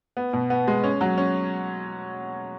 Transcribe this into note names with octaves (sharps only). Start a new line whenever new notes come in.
B3
B2
B3
G#3
C#4
F#3
C#4